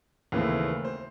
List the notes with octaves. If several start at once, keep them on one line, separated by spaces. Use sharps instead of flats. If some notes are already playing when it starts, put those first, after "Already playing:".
D#2 C#3 E3 A3 C4
C5